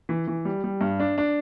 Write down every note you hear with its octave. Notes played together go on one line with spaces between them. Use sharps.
E3
E3
G3
G3
G2
D4
D4